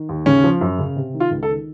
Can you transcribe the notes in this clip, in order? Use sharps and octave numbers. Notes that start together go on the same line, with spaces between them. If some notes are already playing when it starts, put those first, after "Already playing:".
Already playing: D#3
D#2
C#3 C#4
F3
F#2
C#3
C3
D#3
F4
C#2
A4
D#3